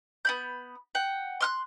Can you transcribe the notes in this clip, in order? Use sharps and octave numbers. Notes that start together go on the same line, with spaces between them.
B3 B5 G6
F#5 G5
C6 F6 F#6